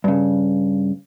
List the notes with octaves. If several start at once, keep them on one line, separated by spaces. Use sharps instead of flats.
G2 C#3